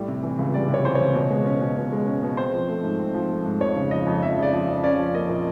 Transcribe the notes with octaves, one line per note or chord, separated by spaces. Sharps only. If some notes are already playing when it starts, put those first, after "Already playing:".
Already playing: A2 G3
C3
E3
C#2
G3 D5
C3
C#5
E3 C5
C#5
C#2
B2
G#3
C#4
B2
B2
G#3
C#4
B2
C4 C5
F3
A3
G#2
C4
F3
A3
G#2
F2 C#5
C#3
F3 D#5
F2
F2 E5
C#3
D5
F3
F2
C#4 D5
F3
A#3 D#5
A#2